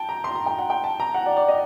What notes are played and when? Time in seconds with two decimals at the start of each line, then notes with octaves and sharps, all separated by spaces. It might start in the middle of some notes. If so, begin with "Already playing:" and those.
Already playing: G5 A5
0.09 A#5
0.24 C6
0.35 A#5
0.46 G5
0.59 F#5
0.70 G5
0.84 A5
1.00 A#5
1.14 F#5
1.26 D5
1.37 D5
1.48 D#5